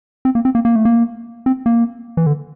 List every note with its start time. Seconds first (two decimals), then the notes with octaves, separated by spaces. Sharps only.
0.25 C4
0.35 A#3
0.45 C4
0.55 A#3
0.65 A#3
0.76 A3
0.85 A#3
1.46 C4
1.66 A#3
2.17 E3
2.26 D3